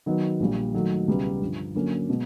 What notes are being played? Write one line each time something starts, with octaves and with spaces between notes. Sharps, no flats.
D#3 F#3 B3 D#4
A#1 A#2 G3
D#3 F#3 A3
C#2 B2 G3 B3
G2 D3 F3
D3 F#3 A#3 C#4
B2 G#3